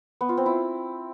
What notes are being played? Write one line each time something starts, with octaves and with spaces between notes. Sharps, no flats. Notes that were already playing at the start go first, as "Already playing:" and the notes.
B3
F4
C4
E4